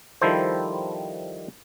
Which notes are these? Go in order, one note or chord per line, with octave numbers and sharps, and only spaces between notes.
D#3 F3 G3 E4 A4 C5